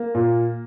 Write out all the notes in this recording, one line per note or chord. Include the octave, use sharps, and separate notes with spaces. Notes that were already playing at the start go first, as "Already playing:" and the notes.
Already playing: A#3
A#2